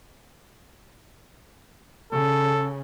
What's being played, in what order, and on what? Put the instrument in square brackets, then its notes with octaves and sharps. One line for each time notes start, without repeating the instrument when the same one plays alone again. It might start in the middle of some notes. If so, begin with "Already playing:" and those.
[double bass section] C#3 [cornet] A4